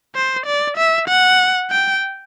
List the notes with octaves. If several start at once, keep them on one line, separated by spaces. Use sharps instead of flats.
C5
D5
E5
F#5
G5